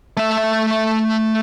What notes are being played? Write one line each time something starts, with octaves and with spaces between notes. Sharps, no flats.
A3 E5